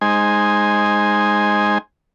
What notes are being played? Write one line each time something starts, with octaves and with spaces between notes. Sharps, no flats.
G#3 D#4 C5 G#5